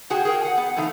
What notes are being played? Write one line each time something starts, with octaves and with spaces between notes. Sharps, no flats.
C3 F#4 G#4 G5 G#5
G#4 A#4 G5
F#5 G#5
B3
C3 E3 A3 D#4 F5